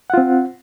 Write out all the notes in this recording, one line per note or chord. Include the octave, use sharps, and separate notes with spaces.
C4 F4 F#5